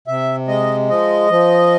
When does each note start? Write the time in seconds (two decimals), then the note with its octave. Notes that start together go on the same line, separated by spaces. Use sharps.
0.07 C3 E5
0.48 G#3 D#5
0.89 F3 D#5
1.30 F3